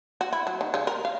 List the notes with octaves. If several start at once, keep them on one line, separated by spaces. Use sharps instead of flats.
F#4
E4
F#3
D#3
C#3
A#4
F5